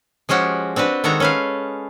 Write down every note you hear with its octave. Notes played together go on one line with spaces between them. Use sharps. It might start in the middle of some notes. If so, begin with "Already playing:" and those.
F3 G#3 C#4 F#4 G4
C4 D4 F#4 B4
D#3 G#3 F#4 A4 A#5
C#4 B4 F5